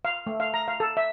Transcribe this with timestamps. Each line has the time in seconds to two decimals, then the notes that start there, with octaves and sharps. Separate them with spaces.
0.05 F5
0.27 A3
0.40 F5
0.54 A#5
0.68 F5
0.80 A4
0.97 E5